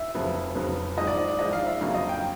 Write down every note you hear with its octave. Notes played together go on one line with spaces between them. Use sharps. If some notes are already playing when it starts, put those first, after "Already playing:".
Already playing: E5
F1 F2 C#3 F#3 B3
F1 F2 C#3 F#3 B3
A#1 G#2 F3 D#5
D5
D#5
D5
A#1 G#2 F3 D#5
F5
E5
G1 F2 C#3 F#3 A#3 F5
D#5
G5